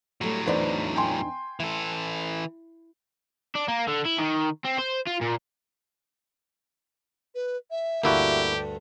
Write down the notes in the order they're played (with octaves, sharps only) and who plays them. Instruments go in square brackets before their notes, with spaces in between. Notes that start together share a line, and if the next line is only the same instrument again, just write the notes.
[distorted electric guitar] A2 F#3 [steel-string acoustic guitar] G3 A3
[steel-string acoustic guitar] E2 D4 D#4 [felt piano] B4 C5 D5
[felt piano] G5 G#5 C6
[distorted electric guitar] E3 A4 [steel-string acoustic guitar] E4
[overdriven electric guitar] D4
A#3
D3
E4
D#3
C4
C5
F4
A#2
[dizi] B4
E5
[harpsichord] D2 G2 D3 [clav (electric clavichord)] A#3 E4 F#4 [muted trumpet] G4